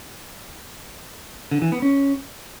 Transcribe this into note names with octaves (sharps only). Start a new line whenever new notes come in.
D3
E3
B3
C#4